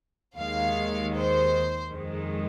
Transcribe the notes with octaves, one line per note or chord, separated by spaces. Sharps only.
D#2 D#3 G#3 F5
C5
F2 D#3 G#3